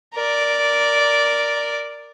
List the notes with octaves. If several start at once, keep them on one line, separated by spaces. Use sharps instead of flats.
A#4 D5